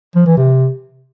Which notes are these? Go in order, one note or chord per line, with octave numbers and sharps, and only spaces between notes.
F3
E3
C3